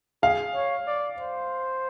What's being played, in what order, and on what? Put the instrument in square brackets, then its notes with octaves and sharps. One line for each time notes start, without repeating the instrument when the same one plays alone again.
[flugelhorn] G#4 [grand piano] F5
[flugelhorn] C#5
D5
C5